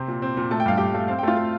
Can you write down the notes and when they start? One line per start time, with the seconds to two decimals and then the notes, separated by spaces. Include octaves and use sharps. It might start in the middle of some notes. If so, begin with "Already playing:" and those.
Already playing: C3 C4
0.08 A#2
0.22 C4
0.37 A#2
0.51 A3 A5
0.60 G5
0.66 G2 F5
0.78 G2 G4 G5
0.94 A3
1.08 C4 F5
1.19 G5
1.23 A3 F4 F5
1.37 A3